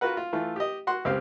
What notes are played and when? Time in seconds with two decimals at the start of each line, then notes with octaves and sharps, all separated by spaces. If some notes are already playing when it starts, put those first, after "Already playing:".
0.01 F4 F#4 A#4 B4 F#5
0.17 F4
0.33 E3 A3 F4
0.56 G4 D#5
0.87 F#4 F#5 C6
1.05 C#2 C4 G4 F5